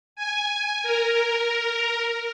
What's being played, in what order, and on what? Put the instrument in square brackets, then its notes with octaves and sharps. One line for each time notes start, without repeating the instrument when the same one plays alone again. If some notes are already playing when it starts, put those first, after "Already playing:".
[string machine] G#5
A#4